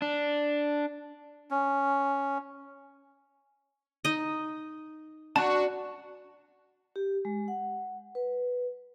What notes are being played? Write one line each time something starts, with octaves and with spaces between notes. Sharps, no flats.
D4
C#4
D#4 D#5
D4 F#4 A5
G4
G#3
F#5
B4